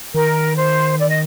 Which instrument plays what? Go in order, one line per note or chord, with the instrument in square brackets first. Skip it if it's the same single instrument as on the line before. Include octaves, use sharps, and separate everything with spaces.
[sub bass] D#3 [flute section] A#4
[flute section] C5
D5
D#5